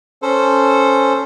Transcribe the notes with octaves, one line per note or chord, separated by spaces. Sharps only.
C#4 A4 C5